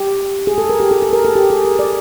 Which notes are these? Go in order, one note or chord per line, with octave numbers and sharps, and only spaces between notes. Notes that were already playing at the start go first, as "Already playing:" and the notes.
Already playing: G4
G#4
A4
A#4
G4
G#4
A4
A#4
A4
G4
G#4
A#4
D5